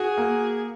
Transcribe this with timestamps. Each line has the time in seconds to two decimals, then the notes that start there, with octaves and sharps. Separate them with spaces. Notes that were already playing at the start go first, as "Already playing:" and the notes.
Already playing: F#4 G#4
0.17 A#3